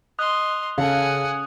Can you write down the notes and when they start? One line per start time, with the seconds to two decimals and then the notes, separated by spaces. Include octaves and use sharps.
0.19 D#5 C6 D#6 F#6
0.78 C#3 A4 F5 F#5 G#5